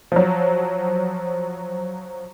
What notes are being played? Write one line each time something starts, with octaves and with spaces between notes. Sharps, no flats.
F3 F#3